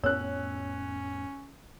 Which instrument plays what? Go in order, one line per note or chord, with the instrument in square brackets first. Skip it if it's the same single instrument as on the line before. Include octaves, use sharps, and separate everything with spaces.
[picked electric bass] F2 A2 B3 [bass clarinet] C#4 [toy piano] C#5 [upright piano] E6 F#6